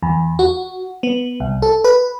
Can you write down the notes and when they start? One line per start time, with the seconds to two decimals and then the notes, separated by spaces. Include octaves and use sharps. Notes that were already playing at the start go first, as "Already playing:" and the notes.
0.03 E2
0.39 F#4
1.03 B3
1.40 C2
1.62 A4
1.84 B4